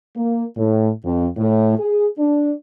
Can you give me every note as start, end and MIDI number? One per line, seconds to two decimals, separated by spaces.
0.16 0.45 58
0.57 0.89 45
1.04 1.26 41
1.37 1.75 45
1.78 2.06 68
2.19 2.53 62